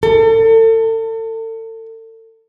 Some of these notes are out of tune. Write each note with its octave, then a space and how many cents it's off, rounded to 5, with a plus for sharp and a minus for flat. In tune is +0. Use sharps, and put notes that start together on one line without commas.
A4 +35